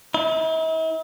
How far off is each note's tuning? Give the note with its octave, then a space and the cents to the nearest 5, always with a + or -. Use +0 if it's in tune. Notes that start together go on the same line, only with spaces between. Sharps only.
E4 -45